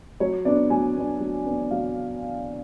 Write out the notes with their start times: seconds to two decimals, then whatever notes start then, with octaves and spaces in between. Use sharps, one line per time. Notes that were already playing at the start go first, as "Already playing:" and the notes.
0.20 F#3 C#5
0.45 B3 D4 D5
0.70 F#3 G#5
0.96 B3 D4
1.21 F#3
1.45 B3 D4
1.71 F#3 F5